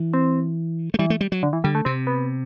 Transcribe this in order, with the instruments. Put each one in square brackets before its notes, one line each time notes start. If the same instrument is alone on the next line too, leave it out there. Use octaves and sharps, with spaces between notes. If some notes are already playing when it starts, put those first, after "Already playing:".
Already playing: [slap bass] E3
[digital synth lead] C4
[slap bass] A3
[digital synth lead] E3 [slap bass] G3
[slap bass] A3
G3
F#3
[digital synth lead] D3
E3
[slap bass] D3 [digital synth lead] G3
[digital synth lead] A3
[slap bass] C3 [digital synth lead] C4
[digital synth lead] B3